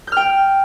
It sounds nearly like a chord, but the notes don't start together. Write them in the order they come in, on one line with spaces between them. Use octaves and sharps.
G6 F6 G5